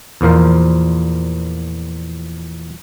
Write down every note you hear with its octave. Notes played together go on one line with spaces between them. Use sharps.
E2 A#2 F3 A#4 C5